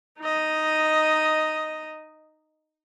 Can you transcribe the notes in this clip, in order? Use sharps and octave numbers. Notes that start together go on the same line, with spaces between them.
D#4 D#5